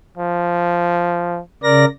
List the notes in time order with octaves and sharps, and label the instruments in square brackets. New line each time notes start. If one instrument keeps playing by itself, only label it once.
[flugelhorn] F3
[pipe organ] C#3 D5 A#6 [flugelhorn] A#4